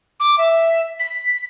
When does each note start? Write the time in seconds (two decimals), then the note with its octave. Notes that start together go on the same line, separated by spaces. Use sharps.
0.20 D6
0.38 E5
1.00 B6